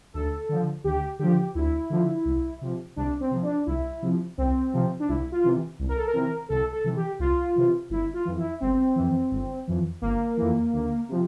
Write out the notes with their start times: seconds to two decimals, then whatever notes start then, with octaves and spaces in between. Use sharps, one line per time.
0.14 D2 A4
0.49 D3 F3
0.84 D2 G4
1.19 D3 F3 G4
1.55 D2 E4
1.90 D3 F3
2.25 C2
2.61 C3 F3
2.96 C2 D4
3.20 C4
3.31 C3 F3
3.43 D4
3.66 C2 E4
4.02 C3 F3
4.38 C2 C4
4.73 C3 F3
5.00 D4
5.09 C2 E4
5.32 F4
5.44 C3 E3
5.79 C2
5.89 A#4
5.97 A4
6.07 A#4
6.13 C3 E3
6.49 C2 A4
6.72 A4
6.84 C3 E3
6.96 G4
7.19 C2 F4
7.56 C3 E3
7.90 G1 E4
8.14 F4
8.25 F2 E3
8.38 E4
8.60 G1 C4
8.96 F2 E3
9.31 G1
9.67 F2 E3
10.02 G1 A#3
10.37 F2 E3
10.73 D2
11.09 C3 F3